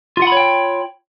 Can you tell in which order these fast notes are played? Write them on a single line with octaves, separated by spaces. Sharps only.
F4 F#5 B5 C#5 G5